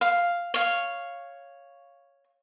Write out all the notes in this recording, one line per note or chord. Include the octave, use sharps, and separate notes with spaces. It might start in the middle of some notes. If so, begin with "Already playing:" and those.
F5
C#5 F5